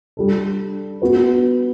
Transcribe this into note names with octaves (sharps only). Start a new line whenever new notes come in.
G3 D4 A4
B3 F#4 B4